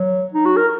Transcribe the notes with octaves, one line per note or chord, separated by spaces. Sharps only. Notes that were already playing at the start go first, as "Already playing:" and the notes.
Already playing: F#3
D#4
F#4
A#4